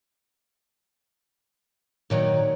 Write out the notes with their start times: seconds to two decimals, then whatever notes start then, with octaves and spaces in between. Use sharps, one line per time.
2.10 A#2 D#3 F#3 F#4 C#5 D5